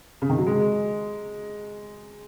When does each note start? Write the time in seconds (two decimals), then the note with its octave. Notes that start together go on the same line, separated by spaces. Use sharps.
0.22 C#3
0.30 D#3
0.38 F#3
0.47 G#3